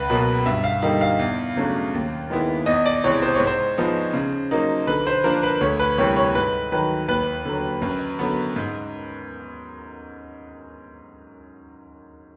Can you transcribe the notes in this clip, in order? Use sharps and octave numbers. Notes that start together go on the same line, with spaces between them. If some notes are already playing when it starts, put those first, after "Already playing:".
Already playing: C#2 B4
B2 F#3 A#3
G2 E5
F5
D3 G3 A#3 D#4
F5
E2
C#3 F#3 A3 D4
D#2
D#3 G#3 B3 E4
E2 D#5
D5
C3 E3 G#3 C#5
C5
G#2 C#5
C5
F3 G#3 B3 D#4
C#3
F#3 A#3 D#4
D3 B4
C5
F3 A#3 D4 A#4
B4
D2 C#5
B4
C3 E3 G3 A#3 C#5
C#5
G#2 B4
D#3 F#3 B4
D#2 B4
D3 F#3
F#2
D3 F#3 B3
G#2